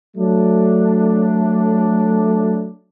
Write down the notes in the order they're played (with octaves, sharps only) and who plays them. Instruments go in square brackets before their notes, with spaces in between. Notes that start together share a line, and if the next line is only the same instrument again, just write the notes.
[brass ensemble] F#3 A3 D4